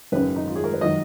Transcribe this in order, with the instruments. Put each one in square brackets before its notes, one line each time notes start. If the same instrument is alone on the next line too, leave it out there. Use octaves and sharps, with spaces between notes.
[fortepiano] G#1 F#2 C#3 B4
D#4
F4
G#4
A#4
B4
D#3 F#3 D#5